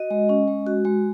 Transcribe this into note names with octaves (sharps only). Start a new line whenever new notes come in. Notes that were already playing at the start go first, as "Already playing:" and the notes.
Already playing: F#4 D#5
G#3
C#4
G#3
F#4
G#3